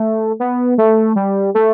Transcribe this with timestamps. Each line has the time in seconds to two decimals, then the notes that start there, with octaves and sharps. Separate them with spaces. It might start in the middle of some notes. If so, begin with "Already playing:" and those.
Already playing: A3
0.40 B3
0.78 A3
1.16 G3
1.55 A3